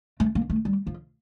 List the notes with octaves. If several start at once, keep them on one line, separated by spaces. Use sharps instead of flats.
A3
A#3
A3
G3
F3